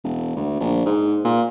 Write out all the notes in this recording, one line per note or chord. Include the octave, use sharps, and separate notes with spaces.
E1
D2
A#1
G#2
A#2